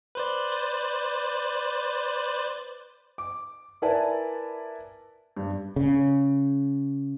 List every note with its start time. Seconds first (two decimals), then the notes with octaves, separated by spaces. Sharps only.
0.15 B4 C5 D5
3.18 D6
3.82 E4 A#4 B4 D5 G#5 A5
5.37 G2
5.76 C#3